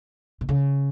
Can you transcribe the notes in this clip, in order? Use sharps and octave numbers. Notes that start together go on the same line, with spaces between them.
B2
C#3